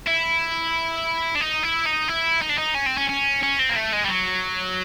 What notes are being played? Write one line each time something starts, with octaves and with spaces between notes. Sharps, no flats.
E4
D4
D#4
E4
D#4
E4
D#4
D4
D#4
C#4
C4
C#4
C#4
C#4
C4
A#3
A3
G#3
G3
F#3